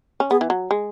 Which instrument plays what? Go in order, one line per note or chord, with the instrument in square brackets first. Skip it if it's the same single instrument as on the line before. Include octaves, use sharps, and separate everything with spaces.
[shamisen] C#4
[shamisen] B3 [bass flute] G#4
[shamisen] E3
F#3
G#3